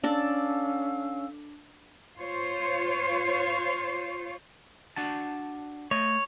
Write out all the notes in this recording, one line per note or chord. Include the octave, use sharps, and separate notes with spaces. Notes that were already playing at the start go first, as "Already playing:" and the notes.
C#4 D4 A4 F5 E6
F4 C5 C#5
D4 F#4 A5
A3 C#5 D#5